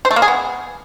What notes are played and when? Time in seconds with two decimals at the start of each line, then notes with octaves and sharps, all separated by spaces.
0.05 C5
0.11 A3
0.16 A#3
0.22 G#4
0.28 B3